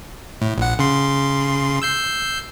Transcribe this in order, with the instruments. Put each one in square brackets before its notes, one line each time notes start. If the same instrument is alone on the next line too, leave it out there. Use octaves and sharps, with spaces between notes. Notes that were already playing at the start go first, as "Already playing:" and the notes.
[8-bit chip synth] A2
A#1 F#5
C#3 C6
E6 G6 C7